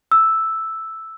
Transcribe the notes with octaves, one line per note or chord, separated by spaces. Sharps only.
E6